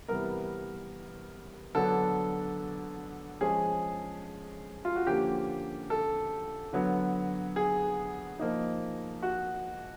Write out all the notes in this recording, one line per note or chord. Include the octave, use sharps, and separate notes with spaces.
C3 E3 G3 B3 A#4
D3 F#3 B3 D4 A4
F3 G#3 C#4 G#4
F4
F#4
D3 F3 A#3 C#4 G4
A4
D3 F#3 B3
G#4
F3 A#3 D#4
F#4